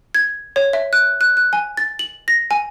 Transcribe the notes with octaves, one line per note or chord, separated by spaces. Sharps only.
G#6
C#5
E5
F#6
F#6
F#6
G#5
A6
F#7
A#6
G#5